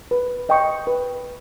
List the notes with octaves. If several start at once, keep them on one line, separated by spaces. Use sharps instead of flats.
B4
D#5 G5 C#6
B4